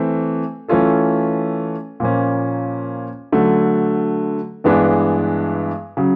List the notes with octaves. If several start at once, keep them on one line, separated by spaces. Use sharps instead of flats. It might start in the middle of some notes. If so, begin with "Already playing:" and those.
Already playing: E3 A3 C4
E3 A3 C#4 F4 A4
A#2 F3 A#3 C#4
D3 F#3 A3
G2 E3 G#3 B3 D4
C#3 F#3